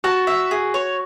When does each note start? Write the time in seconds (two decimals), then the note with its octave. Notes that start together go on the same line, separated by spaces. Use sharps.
0.04 F#4 A5
0.27 E5
0.51 G#4
0.74 C#5